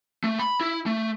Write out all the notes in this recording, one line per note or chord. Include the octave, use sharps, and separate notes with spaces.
A3
B5
E4
A3